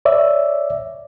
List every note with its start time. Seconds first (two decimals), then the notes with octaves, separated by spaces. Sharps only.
0.05 C#5 D5 E5